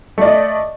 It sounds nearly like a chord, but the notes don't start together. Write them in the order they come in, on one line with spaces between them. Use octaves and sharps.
A3 D5 D#5